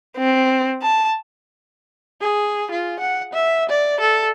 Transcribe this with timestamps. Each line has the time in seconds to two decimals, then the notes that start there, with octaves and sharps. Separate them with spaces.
0.17 C4
0.82 A5
2.21 G#4
2.71 F4
3.00 F#5
3.33 E5
3.69 D5
4.00 A4